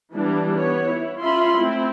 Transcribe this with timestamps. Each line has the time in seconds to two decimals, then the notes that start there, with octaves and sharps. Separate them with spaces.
0.13 E3 G3 B3 D4
0.55 B3 C#5
0.90 E4
1.22 C#4 F4 E5 B5 C6
1.58 A3 C4 E4